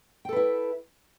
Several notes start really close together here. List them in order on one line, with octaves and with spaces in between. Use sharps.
G5 A4 B4 E4